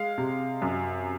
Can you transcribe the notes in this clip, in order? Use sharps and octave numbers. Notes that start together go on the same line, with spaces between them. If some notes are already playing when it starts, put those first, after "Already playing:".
Already playing: G#3 F5
C3
F#2